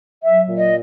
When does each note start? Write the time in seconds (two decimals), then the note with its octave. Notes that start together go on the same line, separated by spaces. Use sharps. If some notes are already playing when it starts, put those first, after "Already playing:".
0.23 F#3 E5
0.49 A#2
0.58 D#5